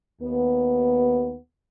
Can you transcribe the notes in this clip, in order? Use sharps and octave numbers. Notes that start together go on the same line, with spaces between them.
D#2 B3